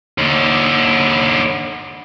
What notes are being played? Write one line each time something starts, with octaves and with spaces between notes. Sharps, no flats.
D#2 D3